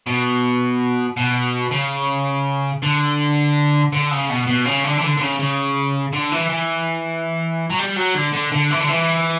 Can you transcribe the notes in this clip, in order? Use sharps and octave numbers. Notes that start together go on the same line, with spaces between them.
B2
B2
C#3
D3
D3
C#3
B2
B2
C#3
D3
E3
D3
D3
C#3
C#3
D3
E3
E3
F#3
G3
F#3
D3
D3
D3
E3
D3
E3